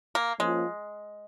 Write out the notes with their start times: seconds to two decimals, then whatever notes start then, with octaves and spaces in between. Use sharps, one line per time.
0.15 A#3
0.39 F3 G#3 A#3 C#4 F4